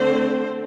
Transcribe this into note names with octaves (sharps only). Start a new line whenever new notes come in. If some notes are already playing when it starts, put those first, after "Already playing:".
Already playing: D3 A3 C4 C5